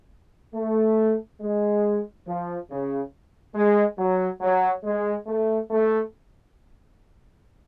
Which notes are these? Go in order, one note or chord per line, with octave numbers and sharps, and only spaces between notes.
A3
G#3
F3
C#3
G#3
F#3
F#3
G#3
A3
A3